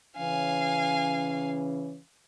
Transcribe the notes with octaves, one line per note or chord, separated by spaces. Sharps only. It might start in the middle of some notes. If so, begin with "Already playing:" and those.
C#3 E3 C#4 F5 G#5